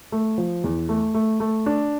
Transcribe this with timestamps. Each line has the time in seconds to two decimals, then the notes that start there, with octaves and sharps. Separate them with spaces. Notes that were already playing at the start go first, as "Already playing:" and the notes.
0.12 A3
0.38 F3
0.64 E2
0.89 A3
1.14 A3
1.40 A3
1.66 D4